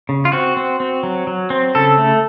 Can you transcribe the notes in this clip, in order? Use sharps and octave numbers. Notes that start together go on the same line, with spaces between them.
C#3
F4
C4 F#4
C4
C4
F#3
F#3
C4
C#3 A4
A3